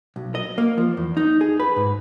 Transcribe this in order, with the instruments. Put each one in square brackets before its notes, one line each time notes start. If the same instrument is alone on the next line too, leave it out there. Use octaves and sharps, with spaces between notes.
[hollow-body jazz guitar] B1
D#5
A#3
F3
E2
D#4
G#4
B4
G#2